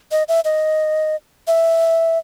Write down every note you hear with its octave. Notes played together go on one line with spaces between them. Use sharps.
D#5
E5
D#5
E5